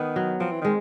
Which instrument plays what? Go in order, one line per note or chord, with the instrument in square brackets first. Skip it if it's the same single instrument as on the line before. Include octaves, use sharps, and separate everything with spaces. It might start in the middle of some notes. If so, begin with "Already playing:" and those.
Already playing: [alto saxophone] D#3 [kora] B3
[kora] F#3
[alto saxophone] F3 [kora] C4
[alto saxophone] E3
[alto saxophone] D#3 [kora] G#3